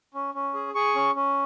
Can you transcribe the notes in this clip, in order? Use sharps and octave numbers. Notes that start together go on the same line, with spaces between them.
C#4
C#4
G#4
G#4 C#6
C#4
C#4